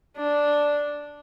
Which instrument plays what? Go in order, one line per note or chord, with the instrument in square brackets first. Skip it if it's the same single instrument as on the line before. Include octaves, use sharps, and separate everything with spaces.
[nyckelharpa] D4